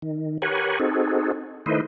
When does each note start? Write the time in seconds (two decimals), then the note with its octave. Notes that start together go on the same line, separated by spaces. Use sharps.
0.02 D#3
0.42 G4 A#4 B4 C#5 F#5 G#5
0.79 C4 D#4 F#4 G#4 A4
1.66 D#3 A3 E4 B4 C5 D#5